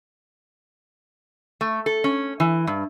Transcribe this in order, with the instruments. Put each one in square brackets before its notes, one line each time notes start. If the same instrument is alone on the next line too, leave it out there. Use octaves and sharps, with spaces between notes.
[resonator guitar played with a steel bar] A3
A4
C#4
E3
G2